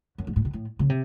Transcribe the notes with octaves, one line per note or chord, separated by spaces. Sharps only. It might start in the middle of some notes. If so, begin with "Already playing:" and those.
F#2
G#2
A2
C3
A2
C#3
C3